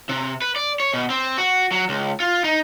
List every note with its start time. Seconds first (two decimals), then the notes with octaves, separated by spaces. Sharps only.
0.09 C3
0.42 B4
0.56 D5
0.80 C#5
0.94 B2
1.10 C4
1.38 F#4
1.72 F#3
1.89 C#2
2.20 F4
2.44 D#4